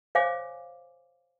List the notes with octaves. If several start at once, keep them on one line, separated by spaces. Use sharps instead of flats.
C5 C#5 F5 G#5 D6